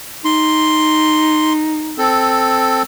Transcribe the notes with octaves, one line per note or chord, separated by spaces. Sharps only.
D#4 C6
C4 A4